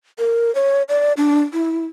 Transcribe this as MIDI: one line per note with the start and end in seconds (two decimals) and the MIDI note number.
0.19 0.53 70
0.55 0.83 73
0.89 1.13 74
1.17 1.43 62
1.53 1.85 64